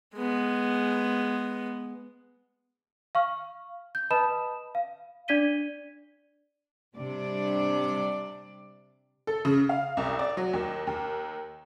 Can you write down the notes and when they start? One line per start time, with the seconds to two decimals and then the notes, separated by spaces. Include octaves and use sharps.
0.16 G#3 B3
3.15 F5 C#6 F6
3.95 G6
4.11 B4 D#5 A5 B5 D#6 E7
4.75 F5
5.28 D4 D5 G#6 B6 D#7 G7
6.96 C3 G3 D4 D5
9.27 A4
9.45 C#3
9.69 F5
9.97 C2
10.19 D5
10.37 F#3
10.53 D#2
10.87 D#2